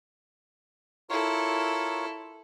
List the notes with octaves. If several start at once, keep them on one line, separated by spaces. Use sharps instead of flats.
E4 F4 A4 A#4 C#5